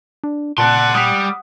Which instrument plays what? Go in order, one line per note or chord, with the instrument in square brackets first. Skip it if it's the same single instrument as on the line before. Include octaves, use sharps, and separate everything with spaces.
[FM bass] D4
[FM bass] A#2 [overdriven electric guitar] D5 C6 [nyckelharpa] F#5 [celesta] A5 F#6
[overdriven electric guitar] G3 [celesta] D#6 B6